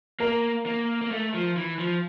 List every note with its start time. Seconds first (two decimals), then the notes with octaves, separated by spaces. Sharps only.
0.20 A#3 A#4
0.66 A#3
1.01 A#3
1.11 A3
1.34 F3
1.57 E3
1.79 F3